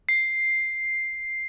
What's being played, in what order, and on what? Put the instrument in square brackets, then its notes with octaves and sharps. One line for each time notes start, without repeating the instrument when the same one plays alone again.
[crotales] C7